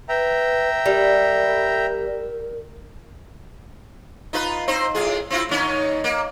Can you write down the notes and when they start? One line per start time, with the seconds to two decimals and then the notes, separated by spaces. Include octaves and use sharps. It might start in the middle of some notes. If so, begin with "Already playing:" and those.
0.09 B4 E5 G5 A#5
0.86 G3 A#4
4.33 D#4 F4 B4
4.68 C4 D#4 C5
4.95 A2 F4 G#4
5.30 C4 E4 F4
5.49 D#2 C#4 D#4
6.04 A#3